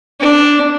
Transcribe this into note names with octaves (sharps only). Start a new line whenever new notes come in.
D4